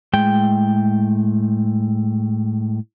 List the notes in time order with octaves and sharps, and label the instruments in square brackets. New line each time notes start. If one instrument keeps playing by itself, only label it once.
[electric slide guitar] A2 G#3 G5